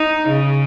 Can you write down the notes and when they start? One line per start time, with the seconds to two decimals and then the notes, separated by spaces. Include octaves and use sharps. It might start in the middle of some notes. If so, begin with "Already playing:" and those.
Already playing: D#4
0.28 C#3